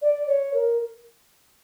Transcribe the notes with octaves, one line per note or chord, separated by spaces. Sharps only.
D5
C#5
A#4